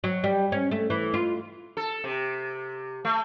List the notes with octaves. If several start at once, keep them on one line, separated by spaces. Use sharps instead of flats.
F#3
G3
C#4
A3
E3
F4
A4
C3
A3